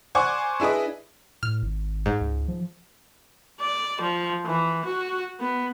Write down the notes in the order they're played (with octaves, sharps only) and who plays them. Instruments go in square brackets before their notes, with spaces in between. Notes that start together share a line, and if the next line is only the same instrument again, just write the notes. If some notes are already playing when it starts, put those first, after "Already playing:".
[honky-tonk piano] C5 D5 F#5 G#5 C#6 D6
D4 E4 G#4 B4 D#5
[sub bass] A2 [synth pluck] F6
[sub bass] G#1
[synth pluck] G#2
[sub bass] C#2
F3
[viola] D5
F3
E3
F#4
B3